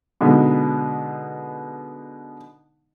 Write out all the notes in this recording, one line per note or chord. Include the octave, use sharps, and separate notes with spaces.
B2 D3 G#3 B3 D#4